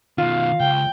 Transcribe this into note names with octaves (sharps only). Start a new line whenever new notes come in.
B2 D#3 F4 F5
C#2 G5